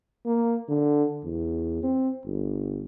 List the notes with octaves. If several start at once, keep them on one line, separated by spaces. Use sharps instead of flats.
A#3
D3
E2
C4
G1